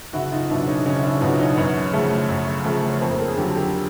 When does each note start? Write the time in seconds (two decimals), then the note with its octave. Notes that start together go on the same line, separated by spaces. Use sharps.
0.13 F#1 E4 F#4
0.32 D#4 F4
0.50 E2 B2 F#3 D4 E4
0.67 C#4 D#4
0.86 F#1 C#4 D#4
1.04 D4 E4
1.21 E2 B2 F#3 D#4 F4
1.39 C#4 D#4
1.57 F#2 B3 C#4
1.93 C#3 F3 A3
2.29 F#2
2.65 C#3 F3 A3
2.89 C#4
3.01 F2 A#3 C4
3.11 A#4
3.20 A4
3.28 G#4
3.37 D3 F#3 F4 G4
3.55 G4 A4